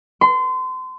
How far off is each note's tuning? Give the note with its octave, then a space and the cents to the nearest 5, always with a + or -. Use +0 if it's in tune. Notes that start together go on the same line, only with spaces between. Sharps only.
C6 -30